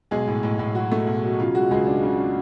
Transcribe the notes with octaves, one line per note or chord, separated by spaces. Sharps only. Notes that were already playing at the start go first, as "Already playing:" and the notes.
B1 G#3 G#4
A2
A2
A2
F#3 F#4
A3
B1
F#3
C#3 F4
G#3 F#4
C#2 G#3 G#4
D4
C#3
D4